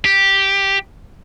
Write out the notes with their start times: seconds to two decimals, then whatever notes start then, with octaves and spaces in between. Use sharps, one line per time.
0.05 G4